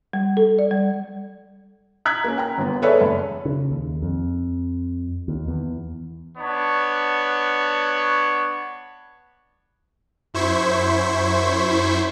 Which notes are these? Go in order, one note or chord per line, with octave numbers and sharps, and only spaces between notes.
G3
A4
D5
G3
A#5 F#6 G#6 B6
A#3 C#4
G5 A#5
G1 B3
G#4 A4 B4 C#5 D5 E5
F#1
C#3
D#2
F2
D#2
E2
B3 D4 C#5
F#2 E4 C5 C#6 G#6 B6